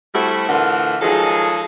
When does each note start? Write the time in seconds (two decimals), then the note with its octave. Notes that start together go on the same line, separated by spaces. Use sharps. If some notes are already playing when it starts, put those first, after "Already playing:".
0.15 G3 A3 C4 E4 F#4
0.49 A2 D3 E3 F4 A#4 F#5
1.02 D#3 F3 F#3 G#3 G#4 A4